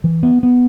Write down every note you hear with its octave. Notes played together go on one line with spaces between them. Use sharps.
E3
B3
B3